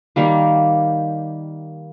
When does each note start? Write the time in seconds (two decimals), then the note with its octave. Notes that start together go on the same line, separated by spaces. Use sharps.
0.16 D#3 G3 A#3